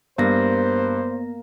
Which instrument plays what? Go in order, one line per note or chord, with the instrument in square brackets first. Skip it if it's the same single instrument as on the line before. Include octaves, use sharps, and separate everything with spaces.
[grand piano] G2 [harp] A#3 [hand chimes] B3 A#6 [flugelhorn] C5